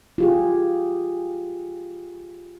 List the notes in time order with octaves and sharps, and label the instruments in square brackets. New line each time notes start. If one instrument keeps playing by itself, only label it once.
[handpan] F4 G4 G#4